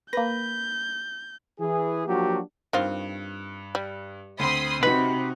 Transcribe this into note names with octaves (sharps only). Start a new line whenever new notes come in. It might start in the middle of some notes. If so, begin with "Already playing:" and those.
A#3 B4 G6 A#6
E3 G#4
F3 F#3 A#3 D4 F#4 G4
G2 D#3 C4 F4
G3
D2 C4 B5 C6 D#6
C3 D#4 F#4 B4 B5